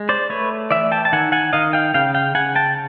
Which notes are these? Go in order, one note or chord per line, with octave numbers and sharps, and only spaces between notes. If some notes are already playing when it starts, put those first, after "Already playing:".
Already playing: G#3
C5 D5
A3 B4 C#5
E3 D5 E5
G5 A5
A5
D#3 F#5 G#5
F#5 G#5
D#3 D#5 F5
F5 G5
C#3 F5 G5
F5 G5
C#3 F#5 G#5
G5 A5